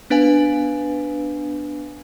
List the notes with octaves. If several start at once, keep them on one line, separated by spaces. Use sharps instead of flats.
B3 D4 B4 F5 G#5